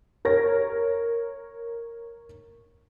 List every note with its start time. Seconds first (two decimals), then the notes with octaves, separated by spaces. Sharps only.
0.25 A#4 C#5 A#6